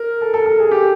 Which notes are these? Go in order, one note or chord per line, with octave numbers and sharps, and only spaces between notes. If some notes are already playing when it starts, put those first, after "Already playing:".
Already playing: A#4
A4
A4
A4
G#4
G4